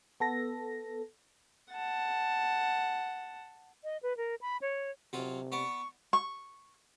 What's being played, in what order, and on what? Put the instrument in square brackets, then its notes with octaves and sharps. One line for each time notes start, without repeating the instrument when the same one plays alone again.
[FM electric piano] B3 A4 A#6
[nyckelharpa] F#5 A5
[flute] D#5
B4
A#4
B5
C#5
[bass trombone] C3 [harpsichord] F#3 F4
[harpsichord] B3 D5 [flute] C#6
[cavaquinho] C#6